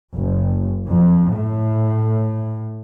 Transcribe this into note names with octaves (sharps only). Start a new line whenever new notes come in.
F#1
F2
A2